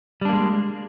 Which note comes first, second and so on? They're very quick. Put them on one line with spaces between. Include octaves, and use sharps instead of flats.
G3 D4 A#3 G#3